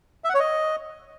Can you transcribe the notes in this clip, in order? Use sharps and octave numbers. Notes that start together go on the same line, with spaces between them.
E5
F#5
C#5
D#5